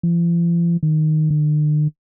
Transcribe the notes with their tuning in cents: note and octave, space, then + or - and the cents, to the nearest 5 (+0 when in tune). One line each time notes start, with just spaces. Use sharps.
F3 -45
D#3 -5
D3 +45